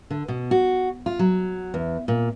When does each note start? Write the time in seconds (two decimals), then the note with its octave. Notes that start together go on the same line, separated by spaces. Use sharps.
0.10 D3
0.28 B2
0.51 F#4
1.06 F4
1.19 F#3
1.74 E2
2.08 A#2